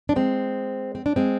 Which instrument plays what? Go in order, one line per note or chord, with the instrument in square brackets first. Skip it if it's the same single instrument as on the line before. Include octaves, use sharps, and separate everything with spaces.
[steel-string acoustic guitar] D4
G#3 C4
C4
D4
G#3 C4